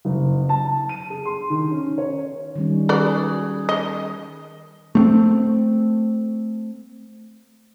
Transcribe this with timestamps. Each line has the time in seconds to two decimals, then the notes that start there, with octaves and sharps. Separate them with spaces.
0.05 F#1
0.49 A5
0.89 D#7
1.10 G#4
1.25 C6
1.50 D#3
1.71 C#4
1.98 C#5
2.56 D#3 G3 C#4
2.89 F#4 G#4 B4 D5
3.69 D#5
4.95 A3 B3 C4